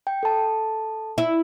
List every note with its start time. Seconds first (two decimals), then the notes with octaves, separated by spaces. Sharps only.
0.07 G5
0.23 A4 A5
1.18 E4